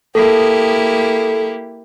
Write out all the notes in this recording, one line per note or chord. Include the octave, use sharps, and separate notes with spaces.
A#3 E4 G4 A4